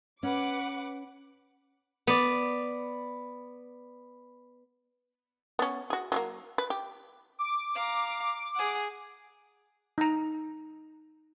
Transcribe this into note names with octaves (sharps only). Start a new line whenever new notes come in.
C#4 B4 F#5 D6
B3 D5
B3 C#4
F#4 G#4
F#3 A3 A#3
B4
G4
D6
F5 A#5
G#4 F#5
D#4 A#5